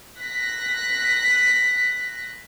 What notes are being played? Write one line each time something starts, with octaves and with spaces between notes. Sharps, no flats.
F#6 A#6 B6